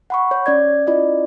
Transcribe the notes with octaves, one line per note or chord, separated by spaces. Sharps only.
F#5 B5 C#6
C#5
C#4 D5 G#6
C#4 E4 F4 D5 D#5